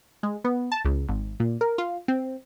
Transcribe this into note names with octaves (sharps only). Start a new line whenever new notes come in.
G#3
B3
A5
C#2
G#1
A#2
A#4
F4
C4